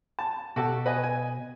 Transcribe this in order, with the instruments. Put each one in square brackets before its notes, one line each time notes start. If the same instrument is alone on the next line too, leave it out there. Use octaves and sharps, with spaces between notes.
[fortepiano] A5
[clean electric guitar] B2 [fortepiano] F#4 G4 A4
[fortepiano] B4 D#5 G#5
G#5